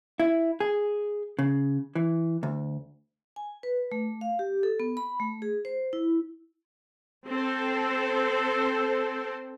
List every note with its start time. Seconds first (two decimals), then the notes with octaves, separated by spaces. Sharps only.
0.20 E4
0.60 G#4
1.39 C#3
1.95 E3
2.43 D2
3.36 G#5
3.63 B4
3.92 A3
4.21 F5
4.39 G4
4.63 A4
4.80 B3
4.97 B5
5.20 A3
5.42 G#4
5.65 C5
5.93 E4
7.28 C4 A4 C5